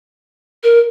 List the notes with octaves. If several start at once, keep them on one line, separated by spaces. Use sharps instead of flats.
A#4